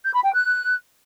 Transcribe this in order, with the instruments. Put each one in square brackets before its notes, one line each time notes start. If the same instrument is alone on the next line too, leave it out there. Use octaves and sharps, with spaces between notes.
[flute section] G6
B5
G5
F#6